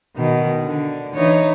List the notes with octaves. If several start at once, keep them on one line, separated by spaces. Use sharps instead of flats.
B2 D#3
D3
E3 D#4 C#5